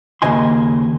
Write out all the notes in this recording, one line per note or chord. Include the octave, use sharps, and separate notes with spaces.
D#2 G#2 C#3 D#5 G#5 C6